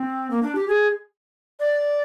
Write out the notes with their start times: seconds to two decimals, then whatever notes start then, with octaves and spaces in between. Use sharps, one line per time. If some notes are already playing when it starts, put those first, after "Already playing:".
Already playing: C4
0.31 A#3
0.43 D4
0.55 G4
0.68 G#4
1.60 D5